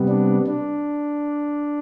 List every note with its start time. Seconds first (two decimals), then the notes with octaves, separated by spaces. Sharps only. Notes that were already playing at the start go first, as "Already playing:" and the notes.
Already playing: C3 G3 B3
0.08 D4
0.47 D4